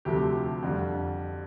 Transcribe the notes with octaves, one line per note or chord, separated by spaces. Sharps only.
D2 C3 F3 A3 G4
F2 D3 G3